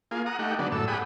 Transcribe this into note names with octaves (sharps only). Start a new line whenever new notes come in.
A#3 F4 G#4
F#5 A#5 D#6
A3 D#4 G4 F#5
D3 F#3 G#3 B3 D4
F#2 A2 A4 E6
G4 G#4 F#5 B5 D#6